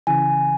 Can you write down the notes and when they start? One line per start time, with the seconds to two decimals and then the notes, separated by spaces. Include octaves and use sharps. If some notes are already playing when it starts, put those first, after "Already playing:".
0.07 C#3 E3 G#5